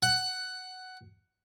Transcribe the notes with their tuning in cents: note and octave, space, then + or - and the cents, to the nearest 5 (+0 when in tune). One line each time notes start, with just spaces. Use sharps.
F#5 +10